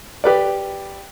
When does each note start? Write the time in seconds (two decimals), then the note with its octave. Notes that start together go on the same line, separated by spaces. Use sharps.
0.24 G4 B4 D5